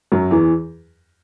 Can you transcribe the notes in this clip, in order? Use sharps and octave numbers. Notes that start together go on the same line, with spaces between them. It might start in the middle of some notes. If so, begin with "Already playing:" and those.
F#2 F#3
E2 E3